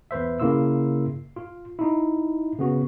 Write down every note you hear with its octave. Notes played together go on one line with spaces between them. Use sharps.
E2 B4 C5 E5
C#3 A#3 E4 C6 E6
F4
D#4 E4
C#3 B3 F#4